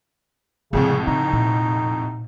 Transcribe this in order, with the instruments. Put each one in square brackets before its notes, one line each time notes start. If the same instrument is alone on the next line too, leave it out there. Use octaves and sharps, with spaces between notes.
[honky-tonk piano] C2 F2 A2 [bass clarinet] C#3 [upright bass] F3 G#3
[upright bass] C#3 [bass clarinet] D#4
[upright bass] A#2